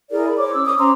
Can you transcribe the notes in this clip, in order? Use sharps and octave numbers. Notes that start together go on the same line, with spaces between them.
E4 G#4 A#4 D5
B5
C5 C#5 D6
C#4 E6
D6 D#6
C#4 C5 A#5 C6